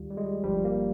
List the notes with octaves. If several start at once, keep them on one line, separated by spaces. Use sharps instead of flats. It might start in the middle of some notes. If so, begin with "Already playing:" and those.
Already playing: D#2 D#3 G3 F4 G4
G3
G#3
G3
G1 G2 F3 G3
A#3